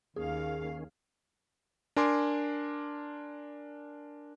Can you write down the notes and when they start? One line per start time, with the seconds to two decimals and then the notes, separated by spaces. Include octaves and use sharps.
0.16 D#2 D#3 C#4 G#4 F5
1.96 D4 A#4 G#5 C6 D6